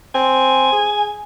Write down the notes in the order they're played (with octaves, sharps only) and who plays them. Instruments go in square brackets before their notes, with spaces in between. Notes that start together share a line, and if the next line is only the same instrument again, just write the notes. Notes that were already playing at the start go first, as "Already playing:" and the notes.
[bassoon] C4 [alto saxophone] G#5
[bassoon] G#4